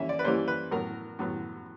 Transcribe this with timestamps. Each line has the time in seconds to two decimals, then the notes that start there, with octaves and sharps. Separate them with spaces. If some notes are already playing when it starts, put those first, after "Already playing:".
Already playing: E3 G3 A#3 C#4 E5
0.09 D5
0.19 B4
0.24 E3 G3 A#3 C#4 C5
0.48 B4
0.71 A2 F#3 B3 A#4
1.19 A2 F#3 B3